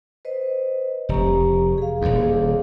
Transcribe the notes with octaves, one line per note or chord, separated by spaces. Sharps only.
B4 C5 D#5
F1 G4 A#5 C#6
G#4 F5
D#1 D#2